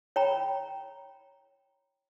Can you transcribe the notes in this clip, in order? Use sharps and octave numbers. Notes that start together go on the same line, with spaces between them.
C#5 G5 A#5 B5